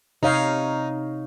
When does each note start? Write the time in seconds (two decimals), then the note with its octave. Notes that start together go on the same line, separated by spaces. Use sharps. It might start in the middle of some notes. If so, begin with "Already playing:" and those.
0.23 C3 D#4 C#5 F5